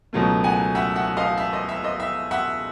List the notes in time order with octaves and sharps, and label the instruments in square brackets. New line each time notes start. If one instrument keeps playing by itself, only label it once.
[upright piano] C#2 B2 F#3 A3
F#5 G#5
E5 F#5
E5 F#5
D#5 F5
E5
D#5
E5
D#5
E5
E5 F#5